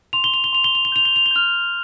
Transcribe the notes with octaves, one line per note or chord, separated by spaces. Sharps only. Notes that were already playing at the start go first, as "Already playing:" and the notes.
C6 F7
G7
F7
G7
C6 F7
G7
F7
G7
G6 F7
G7
F7
G7
F6 G6 F7